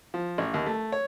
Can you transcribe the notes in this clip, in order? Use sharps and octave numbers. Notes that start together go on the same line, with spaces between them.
F3
A1
D#2
A3
C#5